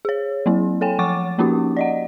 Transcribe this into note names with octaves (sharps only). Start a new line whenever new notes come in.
G#4 C#5
F#3 A#3 C4 E4
A4 C#5 G5 G#5
F3 F#5 C#6 D6 A6
F3 A#3 C#4 D#4 F#4 G4
D5 D#5 F#5